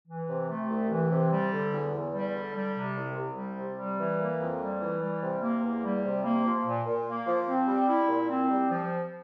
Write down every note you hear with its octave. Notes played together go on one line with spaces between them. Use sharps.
E3
C3
A3
C2
E3
C3
G3
D3
E2
E2
G3
D3
G3
C3
C2
C2
G3
C3
G3
E3
A#3
F2
G3
E3
G3
C3
A#3
E2
G3
C3
A#3
F3
A#2
A#2
A#3
F3
C4
G3
E4
A#2
C4
G3
F3